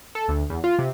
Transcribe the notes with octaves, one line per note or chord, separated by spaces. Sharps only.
A4
D2
E2
F4
C3